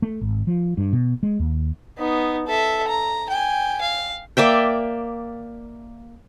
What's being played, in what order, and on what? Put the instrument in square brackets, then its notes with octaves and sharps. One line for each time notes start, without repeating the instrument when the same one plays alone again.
[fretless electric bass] A3
G#1
F3
G2
B2
G#3
D#2
[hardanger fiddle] B3 D#4
A4 E5
A#5
G5 G#5
F5
[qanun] A#3 D5 E5 G5